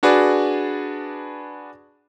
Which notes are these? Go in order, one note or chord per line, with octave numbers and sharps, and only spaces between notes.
D4 F#4 G#4 B4 D5